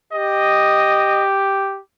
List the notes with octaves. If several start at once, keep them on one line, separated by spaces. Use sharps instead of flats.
G4 D#5